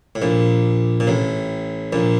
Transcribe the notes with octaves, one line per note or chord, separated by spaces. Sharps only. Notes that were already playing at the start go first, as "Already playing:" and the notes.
A2
A#1 A#2
A#2
A1 A2
A#1 A#2